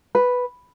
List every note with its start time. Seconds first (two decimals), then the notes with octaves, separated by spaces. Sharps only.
0.15 B4